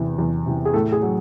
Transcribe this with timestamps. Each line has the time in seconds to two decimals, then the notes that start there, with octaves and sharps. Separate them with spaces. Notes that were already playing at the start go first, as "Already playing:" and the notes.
Already playing: E2 C3 E3
0.18 E2
0.46 C3 E3
0.65 G#4
0.73 A2 A4
0.92 G#4
1.02 F#3